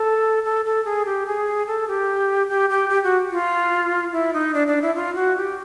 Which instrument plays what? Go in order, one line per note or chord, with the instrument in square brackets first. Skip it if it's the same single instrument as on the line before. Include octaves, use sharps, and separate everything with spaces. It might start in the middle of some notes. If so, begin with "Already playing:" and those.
Already playing: [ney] A4
A4
A4
G#4
G4
G#4
A4
G4
G4
G4
G4
F#4
F4
E4
D#4
D4
D4
E4
F4
F#4
G4